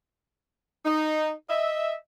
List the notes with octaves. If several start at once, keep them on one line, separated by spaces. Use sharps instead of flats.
D#4
D#5 E5